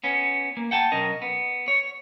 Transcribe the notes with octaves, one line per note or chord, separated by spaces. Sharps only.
B3 C#4
A#3
F#5 G5 A5
B1 C#4 A#4 D#5
B3
C#5